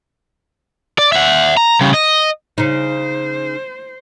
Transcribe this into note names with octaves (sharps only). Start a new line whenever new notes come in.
D5
E5 F#5
A#5
C#3 G3
D#5
C#3 D#4 C5